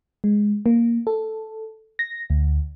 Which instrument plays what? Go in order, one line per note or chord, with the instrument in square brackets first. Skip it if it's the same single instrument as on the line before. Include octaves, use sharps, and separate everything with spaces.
[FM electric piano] G#3
A#3
A4
A#6
D2